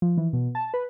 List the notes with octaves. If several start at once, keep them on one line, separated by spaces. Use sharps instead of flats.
F3
E3
B2
A5
B4